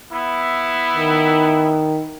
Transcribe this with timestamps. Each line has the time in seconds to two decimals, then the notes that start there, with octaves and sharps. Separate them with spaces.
0.11 B3 E4
0.94 D#3